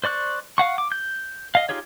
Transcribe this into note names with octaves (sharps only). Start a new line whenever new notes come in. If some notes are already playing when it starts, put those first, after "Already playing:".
C5 D5 C#6 F#6
F5 F#5 C#6
D6
G6
D#5 F5
D#4 F4 G4 G#4 C#5